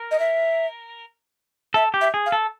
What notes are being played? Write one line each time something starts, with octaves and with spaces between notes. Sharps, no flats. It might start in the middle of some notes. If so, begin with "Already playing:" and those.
Already playing: A#4
D#5
E5
A4 E5
G4
E5
G#4
F5
A4